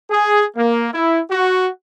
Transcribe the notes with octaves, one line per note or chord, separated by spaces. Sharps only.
G#4
A#3
E4
F#4